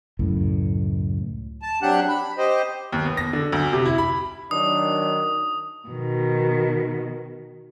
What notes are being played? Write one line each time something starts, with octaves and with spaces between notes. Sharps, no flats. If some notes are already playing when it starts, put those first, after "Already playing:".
C#2 F#2 A2
A5
F#3 C4 D4 G4 F#5 F#6
B5
G4 C5 D#5
D#2
B3
A#6
D3
D2
C3
E4
B5
D#3 F#3 D4 D#6
B2 D#3